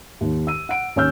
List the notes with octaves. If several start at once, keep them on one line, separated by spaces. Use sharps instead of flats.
D#2
E6 D#7
F#5 D7
D#2 C#4 C#5 E6 F6 G6